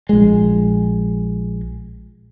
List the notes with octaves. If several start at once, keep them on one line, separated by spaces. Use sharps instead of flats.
A#1 G#3